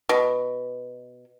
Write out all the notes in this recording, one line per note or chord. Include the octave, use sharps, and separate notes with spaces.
B2